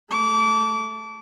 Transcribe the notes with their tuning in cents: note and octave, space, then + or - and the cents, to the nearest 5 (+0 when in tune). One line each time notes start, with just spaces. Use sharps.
A3 +0 D6 -30